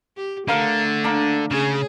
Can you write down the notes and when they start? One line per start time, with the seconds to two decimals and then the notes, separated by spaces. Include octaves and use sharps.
0.17 G4
0.48 D3 A3 A#4 F5 A#5
1.04 A#3 D4
1.51 C#3 G#4